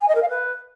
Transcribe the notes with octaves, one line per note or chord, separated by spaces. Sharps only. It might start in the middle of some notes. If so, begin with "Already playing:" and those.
G#5
D#5
A#4
F5
B4